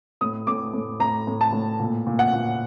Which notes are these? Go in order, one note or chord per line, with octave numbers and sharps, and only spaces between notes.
A2 D#6
A2 D6
A2
A2 A#5
A2
A5
A2
A#2
A#2
F#5
A#2